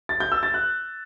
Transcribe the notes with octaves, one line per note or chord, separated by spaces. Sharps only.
A6
G6
E6
A6
F#6